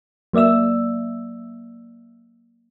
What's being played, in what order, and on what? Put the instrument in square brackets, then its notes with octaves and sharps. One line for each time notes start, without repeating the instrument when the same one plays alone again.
[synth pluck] F#3 A#3 D5 E5 E6